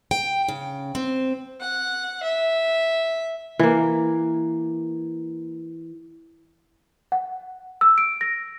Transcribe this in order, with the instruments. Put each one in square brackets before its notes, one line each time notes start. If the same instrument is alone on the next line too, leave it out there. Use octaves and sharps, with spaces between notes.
[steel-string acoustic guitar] G5
C#3
C4
[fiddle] F#5
E5
[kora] E3 A#3
[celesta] F#5
E6
D7
A#6